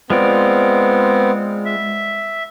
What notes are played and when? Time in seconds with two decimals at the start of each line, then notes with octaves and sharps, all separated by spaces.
0.10 G#3 B3 C4 F4 D5
1.66 E5